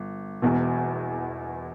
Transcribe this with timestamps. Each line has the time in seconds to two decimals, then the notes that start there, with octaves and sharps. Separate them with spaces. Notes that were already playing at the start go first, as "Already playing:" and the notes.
Already playing: G1
0.42 E1 E2 B2